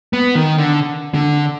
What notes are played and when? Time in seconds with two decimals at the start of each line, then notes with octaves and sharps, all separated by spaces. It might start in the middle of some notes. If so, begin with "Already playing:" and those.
0.13 B3
0.35 D#3
0.58 D3
1.14 D3